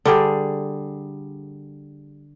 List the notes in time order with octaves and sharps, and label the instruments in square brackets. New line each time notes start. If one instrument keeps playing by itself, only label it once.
[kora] D3 G3 G#4